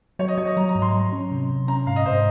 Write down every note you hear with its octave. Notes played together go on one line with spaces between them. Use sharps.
F#3 C#5
D#5
F#3 C#5
D#5
F#3 A#5
A#5
G#2
C6
F#3
C#4
C3
C3
C#4 A#5
G#2 F5
D#5
G#2 C5